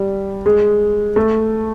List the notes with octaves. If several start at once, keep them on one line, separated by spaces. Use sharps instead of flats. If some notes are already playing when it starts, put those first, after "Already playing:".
Already playing: G3
G#3
A3